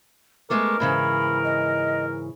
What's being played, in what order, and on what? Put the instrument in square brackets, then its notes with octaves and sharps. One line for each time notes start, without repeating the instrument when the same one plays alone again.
[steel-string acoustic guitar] G#3 A3 B3 [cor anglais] A#4 [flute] D6
[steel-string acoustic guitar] G#2 C#3 E3 [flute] B5
[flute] D#5